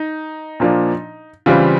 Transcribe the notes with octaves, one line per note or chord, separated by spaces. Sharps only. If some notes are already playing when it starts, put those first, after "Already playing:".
Already playing: D#4
A#2 F3 A#3 D4
C#3 E3 G3 C4 F4